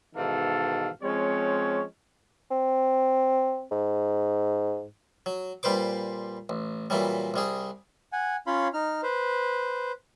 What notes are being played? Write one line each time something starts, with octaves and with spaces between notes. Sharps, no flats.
G#2 B2 D#3 E3 A4 F5
F3 G#3 C4 C#4 C#5
C4
G#2
F#3
A#2 G3 B4 C5 D6
A1
A#2 E3 F#3 G3
C2 G3 G#4
F#5 G#5
C#4 F4 C#5 F5 B5 C6
D#4 F6
B4 C5